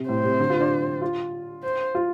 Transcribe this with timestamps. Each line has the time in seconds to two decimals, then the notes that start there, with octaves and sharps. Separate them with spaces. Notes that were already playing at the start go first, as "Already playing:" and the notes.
Already playing: C3
0.09 A2 C5
0.24 C3
0.40 D3
0.50 F4
0.60 D4
1.02 F4
1.64 C5
1.95 F4